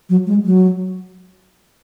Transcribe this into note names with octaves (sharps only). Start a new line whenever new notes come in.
F#3
G#3
F#3